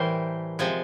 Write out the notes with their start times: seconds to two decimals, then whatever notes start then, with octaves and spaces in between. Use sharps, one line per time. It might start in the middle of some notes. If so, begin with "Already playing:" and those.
Already playing: A2 E3 G3 A#4 C5
0.59 C3 F3 G#3